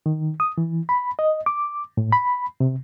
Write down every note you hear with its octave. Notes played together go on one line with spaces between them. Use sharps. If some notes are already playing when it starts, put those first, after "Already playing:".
D#3
D#6
E3
B5
D#5
D6
A2
B5
C3